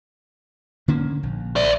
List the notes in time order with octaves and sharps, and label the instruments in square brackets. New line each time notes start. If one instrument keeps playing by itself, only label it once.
[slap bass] D3 A#3 C#4
A#1
[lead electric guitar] D5 E5